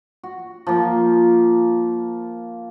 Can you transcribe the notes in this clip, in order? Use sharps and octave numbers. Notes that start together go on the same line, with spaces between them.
F#4
F3 A#3